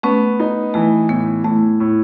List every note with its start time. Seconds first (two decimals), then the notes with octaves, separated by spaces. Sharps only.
0.03 A3 B3 C#4
0.39 D#4
0.74 E3 A3
1.09 A2 B3
1.44 A2 A3
1.80 A2